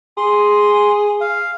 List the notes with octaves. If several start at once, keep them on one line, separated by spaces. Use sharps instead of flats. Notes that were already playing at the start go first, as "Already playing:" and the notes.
G#4 C6
F5